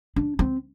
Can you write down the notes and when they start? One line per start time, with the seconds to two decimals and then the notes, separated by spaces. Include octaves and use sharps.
0.16 D4
0.39 C4